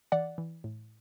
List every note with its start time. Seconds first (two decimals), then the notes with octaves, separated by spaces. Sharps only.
0.12 E3 D5 F#5
0.38 E3
0.64 A2